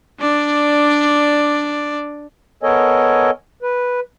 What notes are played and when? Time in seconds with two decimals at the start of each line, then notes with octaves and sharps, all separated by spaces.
0.20 D4 D5
2.63 B3 A4 A#4 C#5 D#5 G#5
3.62 B4